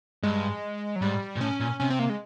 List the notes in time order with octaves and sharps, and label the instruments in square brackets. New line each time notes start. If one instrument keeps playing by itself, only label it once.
[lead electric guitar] G2 [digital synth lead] G#3
[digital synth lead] F#3
[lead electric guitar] G#2 [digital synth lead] G3
[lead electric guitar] A#2
[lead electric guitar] A2 [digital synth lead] C#4
[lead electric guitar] A#2
[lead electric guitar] C3 [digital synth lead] C#4
[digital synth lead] C4
A#3
G#3